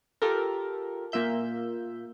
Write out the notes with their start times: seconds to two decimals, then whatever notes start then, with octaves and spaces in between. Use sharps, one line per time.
0.22 F4 G4 A4 A#4
1.12 A#2 A#3 F4 E5 G6